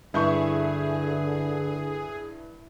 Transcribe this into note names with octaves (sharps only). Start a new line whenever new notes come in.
G2 D3 E4 G#4 E5 C#6 G6